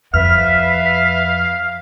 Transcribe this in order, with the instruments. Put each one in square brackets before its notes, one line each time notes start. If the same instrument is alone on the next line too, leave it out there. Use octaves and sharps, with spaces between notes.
[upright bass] F2 [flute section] B4 E5 [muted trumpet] F5 [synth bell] F6